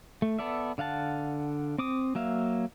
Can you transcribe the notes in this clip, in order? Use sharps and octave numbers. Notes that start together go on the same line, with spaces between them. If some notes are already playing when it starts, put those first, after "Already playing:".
A3
B3 A4 D5 E5
D3 F5 F#5 A5
C4 D6 D#6
F#3 A#3 E5 F5